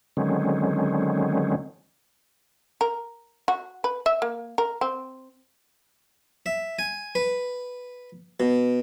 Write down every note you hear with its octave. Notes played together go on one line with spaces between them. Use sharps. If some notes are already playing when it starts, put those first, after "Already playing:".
D3 D#3 F#3 G#3 C4 C#4
A#4
F#4
B4
E5
A#3
A#4
C4
E5
G#5
B4
B2